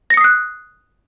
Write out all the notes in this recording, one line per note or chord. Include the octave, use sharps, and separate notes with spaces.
D#6 F#6 A#6 C7 C#7